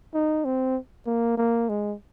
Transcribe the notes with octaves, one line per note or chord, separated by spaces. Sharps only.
D#4
C4
A#3
A#3
G#3